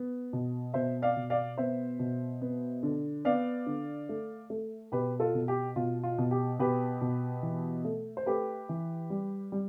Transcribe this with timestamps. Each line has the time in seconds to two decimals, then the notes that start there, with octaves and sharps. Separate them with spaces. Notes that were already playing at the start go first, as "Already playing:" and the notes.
Already playing: B3
0.33 B2
0.74 B2 C5 E5
1.02 D5 F5
1.16 B2
1.30 D5 F5
1.58 B3 C5 E5
1.99 B2
2.41 B3
2.83 D3
3.25 B3 D5 F5
3.66 D3
4.09 A3
4.50 A3
4.92 B2 G4 B4
5.20 F4 A4
5.34 B2
5.48 G4
5.76 B2 F4
6.04 F4
6.18 B2
6.31 G4
6.59 B2 G4 B4
7.01 B2
7.42 E3
7.85 A3
8.17 C5
8.26 A3 G4 B4
8.69 E3
9.10 G3
9.52 G3